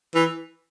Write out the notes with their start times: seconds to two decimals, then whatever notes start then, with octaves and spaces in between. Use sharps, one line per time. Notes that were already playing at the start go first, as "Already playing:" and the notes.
0.15 E3